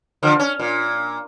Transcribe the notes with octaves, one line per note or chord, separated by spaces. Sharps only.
D3 F3
C#4
A#2